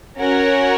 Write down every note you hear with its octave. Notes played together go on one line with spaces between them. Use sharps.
C#4 F#4 A#4 C#5 F#5